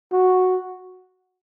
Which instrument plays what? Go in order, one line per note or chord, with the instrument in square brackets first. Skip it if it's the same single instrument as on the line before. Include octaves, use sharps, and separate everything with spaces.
[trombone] F#4